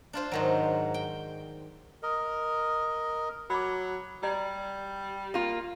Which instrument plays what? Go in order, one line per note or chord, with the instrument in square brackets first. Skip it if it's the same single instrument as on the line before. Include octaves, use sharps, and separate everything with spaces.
[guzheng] D4 F4 C5
G#2 D#3 F#3
G5
[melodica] A#4 D#5
[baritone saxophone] F#3 [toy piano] B5 D6
[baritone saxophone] G3 [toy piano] D5 A#5
[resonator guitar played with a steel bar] A#3 F4